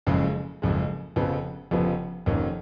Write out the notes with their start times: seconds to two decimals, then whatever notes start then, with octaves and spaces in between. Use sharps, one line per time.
0.07 F#1 F2 C#3 G#3
0.62 F#1 F2 C#3 G#3
1.16 F1 F2 C#3 F3 B3
1.71 F1 F2 C#3 F3 B3
2.26 F1 F2 D#3 A#3 C#4